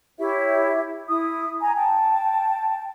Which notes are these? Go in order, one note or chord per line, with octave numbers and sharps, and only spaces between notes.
E4 G4 C#5 E5
E4 D#6
G#5 A#5
G5 A5